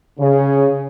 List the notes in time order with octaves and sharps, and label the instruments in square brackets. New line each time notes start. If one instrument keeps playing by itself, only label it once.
[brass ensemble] C#3